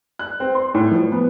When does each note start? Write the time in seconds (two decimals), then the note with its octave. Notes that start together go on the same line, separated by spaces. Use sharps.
0.19 F#6
0.40 C4
0.55 C6
0.74 A2
0.91 F3
1.12 B3